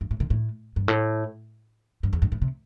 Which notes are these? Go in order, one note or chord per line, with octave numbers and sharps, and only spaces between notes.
G2
A2
C3
A2
G2
A2
G2
E2
G2
A2
C3